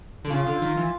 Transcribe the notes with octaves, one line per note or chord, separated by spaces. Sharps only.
D3
C#3 F4
D3
D#3
E3